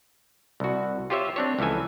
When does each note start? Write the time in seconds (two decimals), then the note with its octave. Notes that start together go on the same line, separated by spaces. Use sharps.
0.60 C2 F#4
1.10 F4 G4 C5 C#5 E5
1.36 C4 D4 C#5
1.59 C#2 E3 F3 A4 G#5